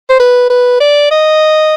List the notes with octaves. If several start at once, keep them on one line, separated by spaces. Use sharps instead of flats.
C5
B4
B4
D5
D#5